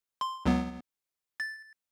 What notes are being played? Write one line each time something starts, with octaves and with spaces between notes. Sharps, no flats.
C6
C#2 F#3 B3
A6